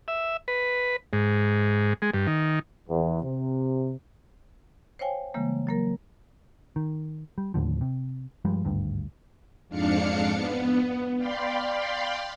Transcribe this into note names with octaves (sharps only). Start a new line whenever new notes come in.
E5
B4
G#2
G#3
G2
D#3
E2
C3
C5 C#5 F5 G5 G#5
C#3 E3 G3 G#3 A#3
F#3 A#3 A#4
D#3
G3
D#2 A2 D3 F3
C3
G2 F3 G3 G#3
G#1 D2 G2
F2 G#2 D4 F5 C#7
B3
D5 F5 G5 B5 C6